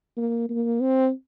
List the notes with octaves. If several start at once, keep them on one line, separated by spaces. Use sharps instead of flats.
A#3
A#3
C4